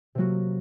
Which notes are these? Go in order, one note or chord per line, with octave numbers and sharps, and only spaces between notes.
C3 F#3 A#3 F#4